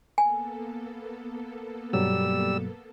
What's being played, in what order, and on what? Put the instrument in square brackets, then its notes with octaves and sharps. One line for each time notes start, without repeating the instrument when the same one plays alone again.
[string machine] A#3 B3 A4 [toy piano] G#5
[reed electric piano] G2 B2 F#3 [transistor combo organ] G3 E6